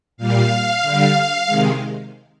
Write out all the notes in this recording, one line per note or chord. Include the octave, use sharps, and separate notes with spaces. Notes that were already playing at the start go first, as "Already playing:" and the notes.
A#2 G3 F5
D3 G3
C3 D#3 G#3